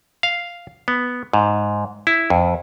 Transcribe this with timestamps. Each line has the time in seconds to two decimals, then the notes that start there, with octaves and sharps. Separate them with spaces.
0.23 F5
0.88 B3
1.33 G#2
2.07 E4
2.30 F2